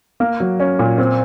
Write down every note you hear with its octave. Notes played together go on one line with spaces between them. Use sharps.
A#3
F#3
C#4
A#2
C4